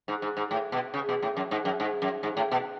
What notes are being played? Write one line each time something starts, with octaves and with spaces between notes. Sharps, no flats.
G#2
G#2
G#2
A2
B2
C#3
B2
A2
F#2
G#2
F#2
G#2
F#2
G#2
A2
B2